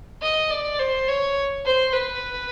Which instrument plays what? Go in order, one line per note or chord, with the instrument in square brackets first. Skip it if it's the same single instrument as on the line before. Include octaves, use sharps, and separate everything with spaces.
[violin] D#5
D5
C5
C#5
C5
B4